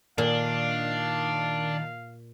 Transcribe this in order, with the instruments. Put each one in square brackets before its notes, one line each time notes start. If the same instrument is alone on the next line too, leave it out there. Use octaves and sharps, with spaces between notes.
[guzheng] A#2 [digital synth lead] D#3 [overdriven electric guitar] D4 [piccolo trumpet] F5